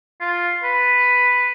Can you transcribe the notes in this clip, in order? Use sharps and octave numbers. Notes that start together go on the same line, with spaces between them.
F4
B4